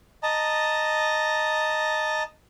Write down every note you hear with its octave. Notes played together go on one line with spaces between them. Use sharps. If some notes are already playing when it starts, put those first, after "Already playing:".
D#5 A5 A#5